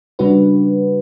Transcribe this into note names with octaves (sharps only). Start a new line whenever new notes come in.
C#3 G3 D4 F#4 B4